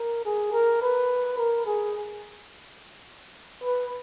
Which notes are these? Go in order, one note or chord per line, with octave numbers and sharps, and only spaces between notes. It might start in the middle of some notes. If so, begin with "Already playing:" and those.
Already playing: A#4
G#4
A#4
B4
A#4
G#4
B4